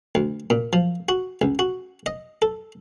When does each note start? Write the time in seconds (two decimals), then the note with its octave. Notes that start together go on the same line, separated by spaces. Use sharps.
0.15 D2
0.50 A#2
0.73 F3
1.09 F#4
1.42 C#2
1.59 F#4
2.06 D#5
2.42 A4